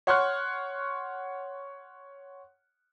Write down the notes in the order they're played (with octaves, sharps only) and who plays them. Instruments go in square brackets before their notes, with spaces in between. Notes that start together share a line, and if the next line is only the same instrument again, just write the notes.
[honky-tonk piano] C#5 F#5 C6 C#6 F6 F#6